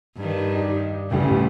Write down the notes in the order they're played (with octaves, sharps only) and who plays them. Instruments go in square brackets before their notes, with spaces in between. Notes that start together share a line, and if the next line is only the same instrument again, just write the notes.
[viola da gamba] G2 D#3
[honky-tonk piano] D4 D#4 G4
[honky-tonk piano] A1 D2 G3 [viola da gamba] A2 C#3